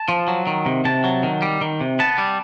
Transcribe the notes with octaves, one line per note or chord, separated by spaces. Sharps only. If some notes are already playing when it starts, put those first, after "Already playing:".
Already playing: A5
F3
F#3
D#3
C3
C3 A5
F#3
D#3
G3
D#3
C3
B3 A5
G3